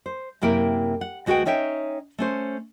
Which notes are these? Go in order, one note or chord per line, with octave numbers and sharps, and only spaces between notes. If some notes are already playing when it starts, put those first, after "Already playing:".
C5
F#2 C3 A#3 E4 A#4 G5
F#5
D2 G#3 F#4 B4 F#5 G5
C#4 D#4 C#5 E5 G5
A3 C#4 C5